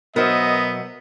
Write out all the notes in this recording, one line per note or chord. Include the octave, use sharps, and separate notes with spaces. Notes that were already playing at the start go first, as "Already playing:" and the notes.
B2 F#3 B3 A#4 C5 D#5 E5